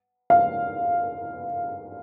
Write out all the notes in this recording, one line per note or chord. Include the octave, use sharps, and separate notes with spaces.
F5